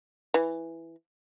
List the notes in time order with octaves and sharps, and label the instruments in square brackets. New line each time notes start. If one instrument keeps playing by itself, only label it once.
[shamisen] E3